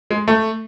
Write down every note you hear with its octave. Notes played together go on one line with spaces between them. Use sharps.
G#3
A3